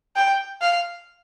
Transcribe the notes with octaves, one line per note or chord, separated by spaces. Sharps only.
G5
F5